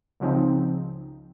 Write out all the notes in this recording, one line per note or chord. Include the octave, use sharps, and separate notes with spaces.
C#2 C#3 F3 C4 D#4